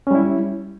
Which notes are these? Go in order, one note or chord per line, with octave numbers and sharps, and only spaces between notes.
G3 C#4 E4